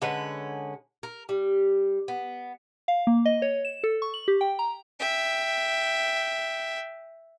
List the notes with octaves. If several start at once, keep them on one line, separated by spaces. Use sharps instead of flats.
D3 G#3 C#4 B4
A#4
G3
B3
F5
A#3
D#5
C#5
E7
A4
C#6
F#7
G4
G5
A#5
E5 G5